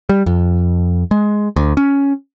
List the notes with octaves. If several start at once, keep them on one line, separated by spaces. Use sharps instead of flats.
G3
F2
G#3
D2
C#4